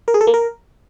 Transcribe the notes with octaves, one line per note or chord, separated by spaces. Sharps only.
A#4
G#4
A4
A#3
A#4